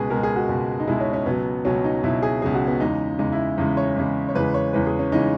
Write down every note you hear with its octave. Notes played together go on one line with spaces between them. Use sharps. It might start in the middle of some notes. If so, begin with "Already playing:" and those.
Already playing: C#2 B2 G#3 G#4 B4
C#2 B2 G#3 A#4
G#4
F#4
C#2 B2 G#3
D#4
C#2 B2 G#3 E4
C#4
C#4
C#2 B2 F#3 B3
C#2 B2 F#3 C#4
D#4
C#2 B2 F#3 E4
G#4
C#2 B2 F#3 G#4
F#4
B3
E2 C#3 G#3 D#4
E2 C#3 G#3 D#4
E4
E2 C#3 G#3
C#5
E2 C#3 G#3
C#5
E2 C#3 E3 G#3 B4
C#5
E2 C#3 E3 G#3 B4
G#4
C#4
C#3 E3 G#3 D#4